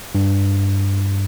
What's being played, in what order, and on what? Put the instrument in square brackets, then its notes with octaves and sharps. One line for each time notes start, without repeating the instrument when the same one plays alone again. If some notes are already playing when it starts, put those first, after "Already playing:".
[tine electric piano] G2